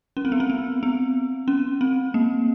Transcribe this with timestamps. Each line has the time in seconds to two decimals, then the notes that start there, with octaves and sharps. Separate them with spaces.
0.17 C#4
0.25 C4
0.32 B3
0.40 C4
0.50 B3
0.83 B3
1.48 C#4
1.81 C4
2.14 A#3